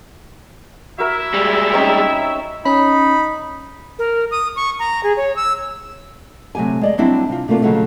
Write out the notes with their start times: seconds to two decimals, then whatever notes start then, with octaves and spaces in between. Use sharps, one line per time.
0.98 E4 F#4 A#4 E5
1.34 G3 G#3
1.73 C4 C#4 D#4
2.66 C#4 D#4 B5
3.99 A#4
4.31 D#6
4.56 C#6
4.79 A#5
5.03 G#4
5.17 C#5
5.36 E6
6.55 C3 F#3 A3 G4 G#5
6.81 G#3 D5 D#5
6.98 F#3 G3 C4 D4 E4
7.29 C3 F4
7.48 C3 A3 A#3 D4 F4
7.62 A#2 C#3 F3 F#3 G#3 A3